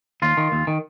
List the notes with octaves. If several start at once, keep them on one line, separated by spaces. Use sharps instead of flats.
D#2 F4
D#3
D#2
D#3